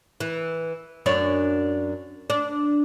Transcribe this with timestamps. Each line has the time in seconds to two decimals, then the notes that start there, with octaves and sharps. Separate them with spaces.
0.20 E3
1.06 F#2 D4 C#5
2.30 D4